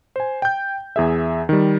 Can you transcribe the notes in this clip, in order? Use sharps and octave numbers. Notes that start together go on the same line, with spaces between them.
C5 G#5
G5 G6
E2 G#4 E5
D#3 G3